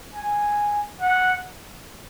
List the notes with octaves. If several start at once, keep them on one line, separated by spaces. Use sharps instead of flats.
G#5
F#5